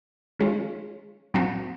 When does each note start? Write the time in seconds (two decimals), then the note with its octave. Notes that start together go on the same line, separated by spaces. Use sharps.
0.39 D#3 G#3 C#4 F4
1.34 A#2 F#3 C4 F#4